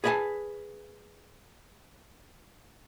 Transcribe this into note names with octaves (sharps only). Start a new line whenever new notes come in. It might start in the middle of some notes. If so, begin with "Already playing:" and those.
G#4 B4 D5 E5 G#5 A5